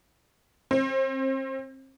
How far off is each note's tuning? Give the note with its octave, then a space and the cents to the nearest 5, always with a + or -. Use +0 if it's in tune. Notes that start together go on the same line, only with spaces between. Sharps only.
C4 +35